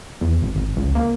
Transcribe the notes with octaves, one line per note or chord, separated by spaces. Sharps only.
E2
G#1
G#1
C#2
A#3